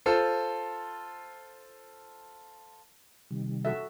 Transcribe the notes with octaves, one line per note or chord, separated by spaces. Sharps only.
F4 A4 C5
C3 D#3 G3
F#4 A4 E5